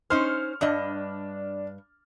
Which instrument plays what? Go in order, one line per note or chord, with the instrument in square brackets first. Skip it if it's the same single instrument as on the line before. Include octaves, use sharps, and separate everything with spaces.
[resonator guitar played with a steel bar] C#4 D#4 C5 [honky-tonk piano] F6
[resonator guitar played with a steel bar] G2 G3 D#5 [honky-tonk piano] D4